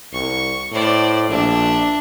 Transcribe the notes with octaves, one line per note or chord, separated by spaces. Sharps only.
C2 C#6
A2 C5 D5
A#1 D4 E5